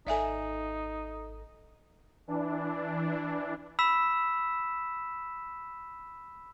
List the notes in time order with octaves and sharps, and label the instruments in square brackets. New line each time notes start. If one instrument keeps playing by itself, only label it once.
[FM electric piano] G#1 A4 [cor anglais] D#4 [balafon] D5 E5 G#5
[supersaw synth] E3 D4
[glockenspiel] B5 E6 B6 E7